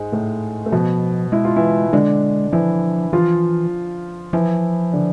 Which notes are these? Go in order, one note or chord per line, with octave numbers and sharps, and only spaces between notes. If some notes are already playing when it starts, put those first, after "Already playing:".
Already playing: G#2 G#3
A2 A3
A3
B2 F3 B3
G#3 E4
F4
E3 E4
D3 G#3 D4
E3 F3 E4
E3 F3 F4
E3 F3 E4
D3 D4